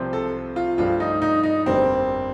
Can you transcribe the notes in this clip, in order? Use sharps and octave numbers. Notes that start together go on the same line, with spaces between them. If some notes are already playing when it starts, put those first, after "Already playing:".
Already playing: C2 C3 F3 C4
A4
F4
G2 F3 A3 F4
D#4
D#4
D#4
G1 F2 D3 G3 A#3 C4